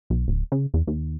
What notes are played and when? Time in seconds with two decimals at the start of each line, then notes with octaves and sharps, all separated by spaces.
0.10 B1
0.28 D1
0.52 C#3
0.74 E2
0.87 D#2